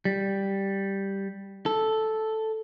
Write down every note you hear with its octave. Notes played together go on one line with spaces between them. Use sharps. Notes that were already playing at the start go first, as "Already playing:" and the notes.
G3
A4